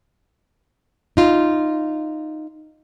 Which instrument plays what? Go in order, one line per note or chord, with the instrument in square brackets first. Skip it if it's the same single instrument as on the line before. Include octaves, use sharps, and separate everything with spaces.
[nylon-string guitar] D#4 F4